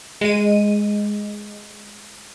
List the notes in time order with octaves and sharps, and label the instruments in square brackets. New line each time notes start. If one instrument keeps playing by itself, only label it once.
[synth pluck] G#3 D#7